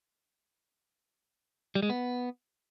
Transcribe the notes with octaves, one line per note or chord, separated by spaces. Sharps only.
G3
G#3
B3